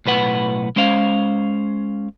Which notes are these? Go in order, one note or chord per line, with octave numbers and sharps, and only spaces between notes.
B1 A2 B4 F#5
G#3 C#4 C5 F5